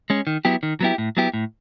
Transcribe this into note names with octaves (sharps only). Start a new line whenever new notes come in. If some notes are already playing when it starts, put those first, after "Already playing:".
G#3 C#4
D#3
F#3 B3 E4 G4
D#3
F#3 B3 E4 G4
A2
F#3 B3 E4 G4
A2